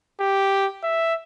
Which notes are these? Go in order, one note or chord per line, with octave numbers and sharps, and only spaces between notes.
G4
E5